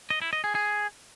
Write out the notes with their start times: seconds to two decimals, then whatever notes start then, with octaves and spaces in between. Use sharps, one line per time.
0.10 D#5
0.22 E4
0.33 D#5
0.44 G#4
0.55 G#4